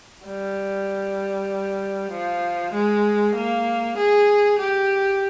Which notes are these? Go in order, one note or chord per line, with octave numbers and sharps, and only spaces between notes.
G3
F3
G#3
A#3
G#4
G4